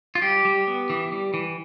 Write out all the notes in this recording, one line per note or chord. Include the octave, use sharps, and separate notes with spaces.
F4
G3 G4
G3
B3
E3
G3
E3